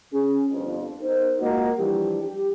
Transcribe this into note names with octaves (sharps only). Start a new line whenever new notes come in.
C#4 G#4
G1 F2
B3 D#4 A#4 C5
G#3 A#3 F4 F#4 A#4 D#5
E3 F3 G3 D4 G4
G4